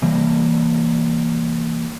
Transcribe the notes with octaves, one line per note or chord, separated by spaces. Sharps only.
C3 E3 G3 A#3